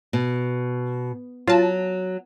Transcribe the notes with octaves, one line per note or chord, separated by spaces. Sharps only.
B2
F#3 F4 A5